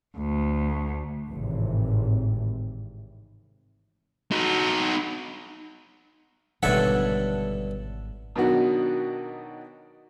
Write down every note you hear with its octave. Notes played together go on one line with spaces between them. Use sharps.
D2
G#1 A2 C3 E3
D#4 F#4
G#1 G2 B2 D3 A4 C#5 E5 F#5
B2 D#3 F#3 D4 D#4 F#4